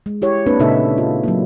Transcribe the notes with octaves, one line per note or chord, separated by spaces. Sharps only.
G#3
E4 G4 C#5
A#3 C4 D4 B4
A#2 C#3 D#4 A4 E5
F4
F#3 A3 A#3